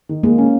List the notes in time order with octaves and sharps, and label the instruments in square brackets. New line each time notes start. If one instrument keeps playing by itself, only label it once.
[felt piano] D#3
[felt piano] G#3 [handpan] A#3
[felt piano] C#4